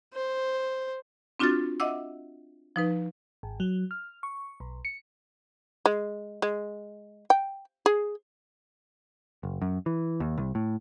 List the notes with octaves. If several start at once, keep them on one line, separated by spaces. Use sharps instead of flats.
C5
C4 D4 F4 F#4 F6 A6
D#5 E5 F#5 D6 E6
F3 D#4 B4
G#1
F#3
F6
C#6
B1
C#7
G#3
G#3
G5
G#4
F#1
F#2
E3
D#2
C2
A2